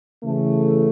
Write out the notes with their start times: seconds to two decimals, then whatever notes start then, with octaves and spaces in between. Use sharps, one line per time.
0.24 C#3 E3 A3